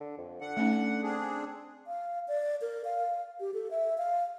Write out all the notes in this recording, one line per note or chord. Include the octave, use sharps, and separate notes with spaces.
D3
F2
D3 F#5
A3 C#4 D#4
C4 D4 G#4
F5
D5
A#4
F5
G4
A4
E5
F5